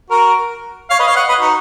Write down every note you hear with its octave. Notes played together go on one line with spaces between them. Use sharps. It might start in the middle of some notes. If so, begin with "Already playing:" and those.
F#4 A#4
C#5 F5
B4 D#5
C#5 F5
D#5 F#5
B4 D#5
D#4 F#4